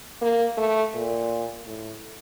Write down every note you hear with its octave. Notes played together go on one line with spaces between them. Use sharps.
A#3
A3
A#2
A2